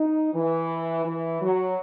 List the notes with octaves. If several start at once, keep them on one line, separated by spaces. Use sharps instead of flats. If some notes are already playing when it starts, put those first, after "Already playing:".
Already playing: D#4
E3
E3
F#3